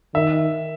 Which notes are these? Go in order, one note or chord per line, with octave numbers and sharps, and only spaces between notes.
D#3 E5